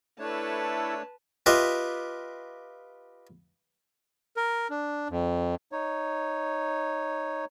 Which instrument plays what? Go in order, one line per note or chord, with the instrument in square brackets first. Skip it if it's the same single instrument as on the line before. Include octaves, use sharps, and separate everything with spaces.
[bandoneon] A3 D4 C#5 [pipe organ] E4 A4 [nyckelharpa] B4 A5
[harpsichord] F4 G4 B4 D#5 E5
[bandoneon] A#4
D4
F2
D#4 C#5